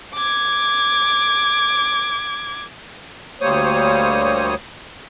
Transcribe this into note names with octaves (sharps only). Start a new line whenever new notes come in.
D6 G#6
D2 G3 A#3 C5 C#5 D#6